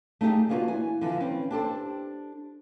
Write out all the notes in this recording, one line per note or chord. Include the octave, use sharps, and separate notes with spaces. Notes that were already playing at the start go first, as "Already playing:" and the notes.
A3 D#4 F4 G4 G#4
A#3 B3 D4 F4 F#4 B4
E3 G#5
D3 E3 F3
C4 C#4 B4
D4 G4 A4 C5